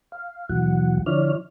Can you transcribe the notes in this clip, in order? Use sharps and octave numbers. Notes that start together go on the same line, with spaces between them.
F5
D#2 B2 E3 F#3 F#5
D3 F3 E4 C#5 D5 F6